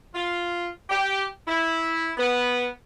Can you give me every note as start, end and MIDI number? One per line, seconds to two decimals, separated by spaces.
0.14 0.68 65
0.90 1.25 67
1.47 2.09 64
2.17 2.67 59